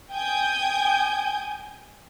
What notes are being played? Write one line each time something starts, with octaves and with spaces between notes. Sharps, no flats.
G5 G#5 D#6 G6 G#6